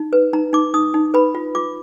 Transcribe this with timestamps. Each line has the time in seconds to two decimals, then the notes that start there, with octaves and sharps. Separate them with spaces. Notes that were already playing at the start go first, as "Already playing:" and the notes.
Already playing: D#4
0.13 B4
0.33 D#4 A#5
0.53 D#4 D6
0.74 D#4 D#6
0.94 D#4
1.14 B4 B5
1.35 F4
1.55 F4 D6